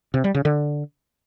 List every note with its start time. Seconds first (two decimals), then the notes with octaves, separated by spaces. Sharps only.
0.14 C3
0.24 G3
0.35 C#3
0.45 D3